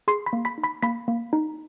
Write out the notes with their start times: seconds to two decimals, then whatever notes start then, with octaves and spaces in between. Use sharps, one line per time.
0.08 G#4 C6 C7
0.26 B5 B6
0.33 A#3
0.45 B5 B6
0.58 D#4
0.64 B5 B6
0.83 A#3 B5 B6
1.08 A#3
1.33 D#4